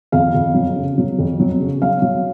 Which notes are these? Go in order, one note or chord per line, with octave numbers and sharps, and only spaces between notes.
F2 F5
F2
F#3
C#3
F#3
F2
F#3
C#3
F#3 F5
F#3